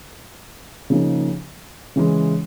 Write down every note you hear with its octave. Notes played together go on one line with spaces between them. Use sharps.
C#3 F3 A#3 D#4 G#4
C#3 E3 G#3